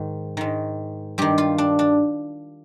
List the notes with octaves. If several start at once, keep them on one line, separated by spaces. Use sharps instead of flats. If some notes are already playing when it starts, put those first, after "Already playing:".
Already playing: G#2 D#3
G#2 D#3
G2 D#3 G4
F4
D4
D4